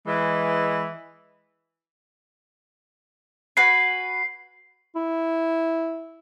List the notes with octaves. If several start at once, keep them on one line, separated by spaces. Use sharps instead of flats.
E3 G#3
F#4 B4 G#5 C7
E4